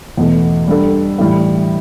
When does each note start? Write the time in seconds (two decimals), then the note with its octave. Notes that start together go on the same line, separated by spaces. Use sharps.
0.17 E2 B2 A3
0.68 G3 D4 A4
1.18 A2 E3 G3